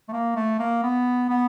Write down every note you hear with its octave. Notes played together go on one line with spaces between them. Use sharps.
A3
A#3
A3
A#3
B3
B3